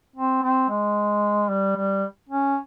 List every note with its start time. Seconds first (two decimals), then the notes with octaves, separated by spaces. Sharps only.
0.16 C4
0.43 C4
0.69 G#3
1.49 G3
1.76 G3
2.29 C#4